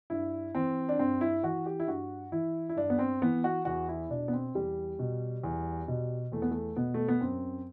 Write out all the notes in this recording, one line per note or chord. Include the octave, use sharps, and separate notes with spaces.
G2 E4
E3 C4
D4
G2 C4
E4
E3 F#4
G4
E4
G2 F#4
E3 E4
E4
G2 D4
B3
C4
E3 B3
F#4
E2 F#4
E4
B2 D4
B3
C4
E2 G3
B2
E2
B2
E2 A3
B3
A3
B2 B3
A3
B3
F#2 C4